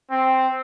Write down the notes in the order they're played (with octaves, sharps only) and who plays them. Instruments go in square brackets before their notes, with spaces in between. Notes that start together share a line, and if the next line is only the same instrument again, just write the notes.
[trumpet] C4